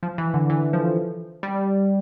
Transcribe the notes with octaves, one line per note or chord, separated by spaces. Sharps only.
F3
E3
D3
E3
F3
G3